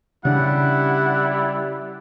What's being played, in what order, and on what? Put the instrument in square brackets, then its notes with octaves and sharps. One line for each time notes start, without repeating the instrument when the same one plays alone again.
[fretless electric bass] C#3 D4 [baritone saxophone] G3 [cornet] E4 [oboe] F#5